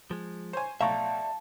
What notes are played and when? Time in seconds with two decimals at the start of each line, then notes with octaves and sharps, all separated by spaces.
0.11 F3 G#3
0.53 C5 C#5 G#5
0.81 B1 A2 D5 E5 F5 A5 A#5 C#6